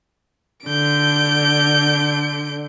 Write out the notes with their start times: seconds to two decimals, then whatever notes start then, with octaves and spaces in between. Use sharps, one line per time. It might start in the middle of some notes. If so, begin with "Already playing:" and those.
0.67 D3 G6 D7